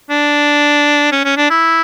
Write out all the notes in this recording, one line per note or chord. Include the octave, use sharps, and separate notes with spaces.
D4
C#4
C#4
D4
E4